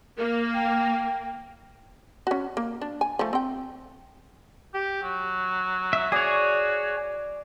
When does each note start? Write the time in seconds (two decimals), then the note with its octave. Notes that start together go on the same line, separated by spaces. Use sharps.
0.17 A#3 A#4
0.54 G5
2.27 C#4 F#4
2.57 A#3
2.82 D4
3.01 G#5
3.19 F3 A3
3.33 C4 G5
4.74 G4
5.03 F#3
5.93 E5
6.12 F#4 G#4 C#5 D5